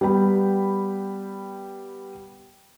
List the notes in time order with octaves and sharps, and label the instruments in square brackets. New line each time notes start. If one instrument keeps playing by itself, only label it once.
[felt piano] G3 B3 G5 B5